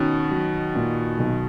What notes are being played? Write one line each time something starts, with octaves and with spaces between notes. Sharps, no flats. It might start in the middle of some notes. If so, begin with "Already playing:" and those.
Already playing: B2 D#3 C#4
F#3
A#2
B1